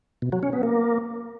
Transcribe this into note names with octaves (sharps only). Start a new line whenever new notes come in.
B2
F#3
C#4
B3
A#3